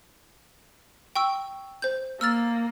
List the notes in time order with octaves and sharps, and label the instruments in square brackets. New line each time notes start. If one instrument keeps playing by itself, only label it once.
[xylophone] G5 C#6 E6
C5 G6
[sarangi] A#3 [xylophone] E6 F6 A6